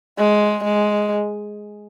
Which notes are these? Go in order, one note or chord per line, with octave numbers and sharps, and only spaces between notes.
G#3
G#3